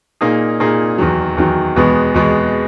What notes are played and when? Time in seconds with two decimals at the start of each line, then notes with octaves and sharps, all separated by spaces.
0.21 A#2 A#3 D#4 G#4
0.60 A#2 A#3 D#4 G#4
0.98 E2 D#3 F#3
1.37 E2 D#3 F#3
1.76 E2 B2 G#3 B3
2.14 E2 B2 G#3 B3